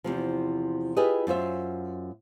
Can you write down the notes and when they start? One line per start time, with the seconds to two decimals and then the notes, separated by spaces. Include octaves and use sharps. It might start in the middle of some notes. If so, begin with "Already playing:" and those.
0.04 E2 C3 F3
0.97 E4 F4 G4 G#4 B4 D#5
1.27 F#2 F4 C5 E5